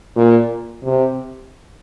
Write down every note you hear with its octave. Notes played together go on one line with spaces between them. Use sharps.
A#2
C3